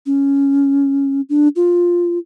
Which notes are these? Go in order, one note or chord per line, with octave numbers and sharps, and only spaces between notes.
C#4
D4
F4